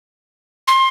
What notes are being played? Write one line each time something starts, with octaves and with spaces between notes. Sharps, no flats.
C6